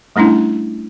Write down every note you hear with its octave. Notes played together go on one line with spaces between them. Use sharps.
G3 A3 C#4 D4 E4